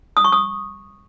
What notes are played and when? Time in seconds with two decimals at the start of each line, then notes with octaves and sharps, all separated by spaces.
0.17 D#6
0.24 C#6
0.32 D#6